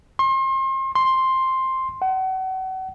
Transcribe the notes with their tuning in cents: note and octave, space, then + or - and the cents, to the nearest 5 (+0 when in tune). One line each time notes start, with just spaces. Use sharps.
C6 +35
C6 +5
F#5 +35